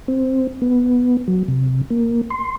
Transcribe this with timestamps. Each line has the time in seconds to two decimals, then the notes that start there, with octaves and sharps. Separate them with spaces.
0.08 C4
0.62 B3
1.28 F#3
1.48 C3
1.90 A#3
2.30 C6